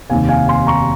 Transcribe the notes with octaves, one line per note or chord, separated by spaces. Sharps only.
F1 D#2 D#3 F5 G#5
F5 G#5
G#5 C6
A#5 C#6